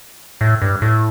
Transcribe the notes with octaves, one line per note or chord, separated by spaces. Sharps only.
A2
G2
A2